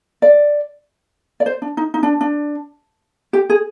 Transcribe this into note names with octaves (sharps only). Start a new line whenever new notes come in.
D5
D5
C5
D4
D#4
D#4
D4
D4
G4
G#4